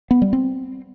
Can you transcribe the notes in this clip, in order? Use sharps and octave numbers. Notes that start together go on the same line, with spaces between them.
B3
G3
C4